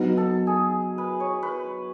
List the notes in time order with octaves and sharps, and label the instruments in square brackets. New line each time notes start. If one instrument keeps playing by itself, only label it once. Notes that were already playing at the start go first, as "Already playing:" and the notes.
Already playing: [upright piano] F#3 B3 D#4
[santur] A4
G#4
B4
C#5
B4